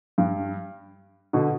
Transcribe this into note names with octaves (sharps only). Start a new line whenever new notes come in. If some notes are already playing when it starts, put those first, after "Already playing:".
G2
B2 D3